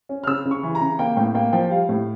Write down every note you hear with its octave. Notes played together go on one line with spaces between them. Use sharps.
C#4
F6
C#3 E6
C#3
C#6
E3
A#5
C#3
A#3 G5
A2 G5
A#3 G5
F3 G5
G3 F5
A2